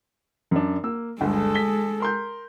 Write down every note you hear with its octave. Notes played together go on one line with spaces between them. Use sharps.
F#2 D4
A#3 E6
G1 D2 G#3 A4
B6 G7
A#4 C6 G6